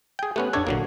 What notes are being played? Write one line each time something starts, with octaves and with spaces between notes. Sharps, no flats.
G#4 G5
A3 B3 C#4 G4 F#6
F2 D4 A4 C#5 D5 G#6
G#1 A#2 D3 F#3 A#3